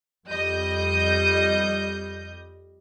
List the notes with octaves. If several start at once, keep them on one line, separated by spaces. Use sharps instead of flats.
F2 G3 D#5 G6